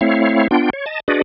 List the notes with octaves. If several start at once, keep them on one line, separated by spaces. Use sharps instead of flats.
A3 C4 E4 C#5 F5
B3 D4 F4 G5
C#5
D#5 A5
D4 F#4 G#4 B4 D5 D#5